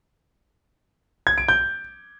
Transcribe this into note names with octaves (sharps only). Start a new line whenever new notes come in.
G#6
D7
G6